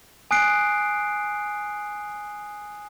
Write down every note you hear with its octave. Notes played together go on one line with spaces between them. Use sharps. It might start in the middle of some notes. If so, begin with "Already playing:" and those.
G#5 D#6 F#6 C7 D7